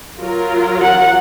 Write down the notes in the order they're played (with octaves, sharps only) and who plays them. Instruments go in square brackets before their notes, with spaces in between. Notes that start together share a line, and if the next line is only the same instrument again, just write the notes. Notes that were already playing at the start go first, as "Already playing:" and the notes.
[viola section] F#3 F4 A#4
[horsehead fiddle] F#5